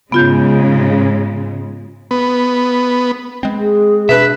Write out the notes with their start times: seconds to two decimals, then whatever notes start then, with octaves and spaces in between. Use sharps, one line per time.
0.12 G#2 C#3 G#3 B3 F4 G6
2.11 B3
3.43 G#3 C4
3.59 G#4
4.09 B2 D4 B4 E5